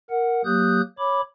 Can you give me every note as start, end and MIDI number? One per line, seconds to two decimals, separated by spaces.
0.10 0.42 70
0.10 0.42 78
0.45 0.81 54
0.45 0.81 58
0.45 0.81 67
0.45 0.81 87
0.45 0.81 90
0.45 0.81 91
0.98 1.21 73
0.98 1.21 83
0.98 1.21 86